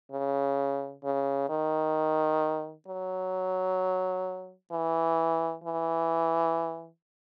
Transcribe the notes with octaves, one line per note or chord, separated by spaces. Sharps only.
C#3
C#3
D#3
F#3
E3
E3